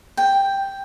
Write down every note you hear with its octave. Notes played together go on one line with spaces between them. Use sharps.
G5